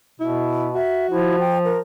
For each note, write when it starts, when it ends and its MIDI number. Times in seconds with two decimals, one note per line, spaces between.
0.20 0.78 47
0.20 0.68 64
0.75 1.43 66
0.75 1.07 76
1.11 1.78 53
1.11 1.38 64
1.40 1.58 79
1.65 1.79 70